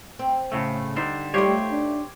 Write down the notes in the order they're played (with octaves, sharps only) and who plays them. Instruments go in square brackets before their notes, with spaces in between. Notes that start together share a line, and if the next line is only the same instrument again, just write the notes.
[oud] C4
[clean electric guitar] A2 C#3 A3
[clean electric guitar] D3 G3 C5 [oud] D#4
[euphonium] G3 [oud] A3 D#4 F4 [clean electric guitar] G4 C5 C#5
[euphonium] D4